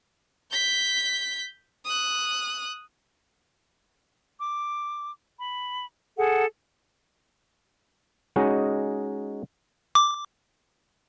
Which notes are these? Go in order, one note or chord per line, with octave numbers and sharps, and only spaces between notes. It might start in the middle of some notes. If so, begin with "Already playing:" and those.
G6 B6
D#6 F#6
D6
B5
G#4 A4 F#5
G#3 C#4 D#4 F#4 G#4
D6